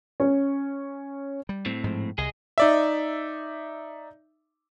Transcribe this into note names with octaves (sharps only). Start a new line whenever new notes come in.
C#4
G3
A2 C4
G#2 F3
C2 G#4 D#5
D#4 D5 E5